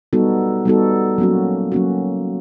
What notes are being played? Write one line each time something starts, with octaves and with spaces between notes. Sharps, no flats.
G3 B3 D#4 F#4 A4
G3 B3 D#4 F#4 A4
F#3 A#3 C#4 F#4
F#3 A#3 C#4 F#4